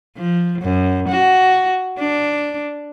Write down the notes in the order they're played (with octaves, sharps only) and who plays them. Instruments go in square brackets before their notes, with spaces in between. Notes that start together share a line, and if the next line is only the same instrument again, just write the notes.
[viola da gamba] F3
F#2
F#4
D4